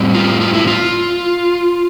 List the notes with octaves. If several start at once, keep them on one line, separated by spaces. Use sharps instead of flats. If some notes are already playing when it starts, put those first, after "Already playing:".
Already playing: A2 G3 C4
F4
F4
E4
F4